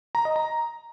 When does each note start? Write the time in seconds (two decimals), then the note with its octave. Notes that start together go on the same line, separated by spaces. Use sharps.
0.15 A#5
0.25 D#5
0.36 A#5